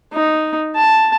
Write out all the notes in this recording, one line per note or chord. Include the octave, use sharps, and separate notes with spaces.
D#4
A5